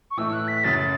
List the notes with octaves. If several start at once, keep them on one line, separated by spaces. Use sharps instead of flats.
C#6
A2 E3 A3 E4 E6
F#6
B6
F#2 C#3 F#3 A6
A6